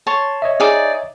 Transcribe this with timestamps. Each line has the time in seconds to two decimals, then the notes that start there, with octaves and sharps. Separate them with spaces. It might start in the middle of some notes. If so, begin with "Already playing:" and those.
0.07 C#5 A5 C6
0.42 C#5 D#5 E5
0.60 D#4 G#4 D5